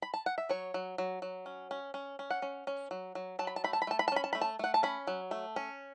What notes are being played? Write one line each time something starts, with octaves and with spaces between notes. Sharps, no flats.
B5
A5
F#5
E5
F#3 C#5
F#3
F#3
F#3
C#4
C#4
C#4
C#4
F#5
C#4
C#4
F#3
F#3
F#3 A5
B5
A5
A3 B5
A5
B5
A3 A5
B5
A5
C#4 B5
A5
A3 B5
A5
A3 F#5
A5
C#4 B5
F#3
A3
C#4